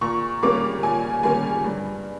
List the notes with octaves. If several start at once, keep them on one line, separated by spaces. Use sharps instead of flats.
A#2 C#6
G3 A#3 C#4 D6
A#2 G#5
G3 A#3 C#4 G#5
G2